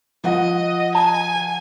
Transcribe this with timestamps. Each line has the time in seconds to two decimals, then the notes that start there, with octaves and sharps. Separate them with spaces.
0.24 F3 D#5 F#5
0.95 G#5 A5